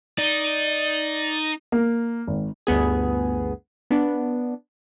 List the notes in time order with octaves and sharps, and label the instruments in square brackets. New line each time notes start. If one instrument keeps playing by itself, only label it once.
[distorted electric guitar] D#4 [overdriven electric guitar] D5
[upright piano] A#3
G#1
[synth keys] G1 D2 B3 G#4
B3 D4